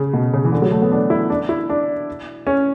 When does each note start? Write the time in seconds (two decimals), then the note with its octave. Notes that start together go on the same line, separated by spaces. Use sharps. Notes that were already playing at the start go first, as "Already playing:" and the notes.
Already playing: C#3
0.13 B2
0.33 C#3
0.45 E3
0.52 D3
0.62 F#3
0.71 A3
0.82 B3
0.92 D4
1.10 E4
1.30 D4
1.49 E4
1.70 D4
2.47 C#4